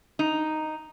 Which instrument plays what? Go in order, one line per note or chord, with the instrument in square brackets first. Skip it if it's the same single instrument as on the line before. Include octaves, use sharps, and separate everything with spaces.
[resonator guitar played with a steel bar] D#4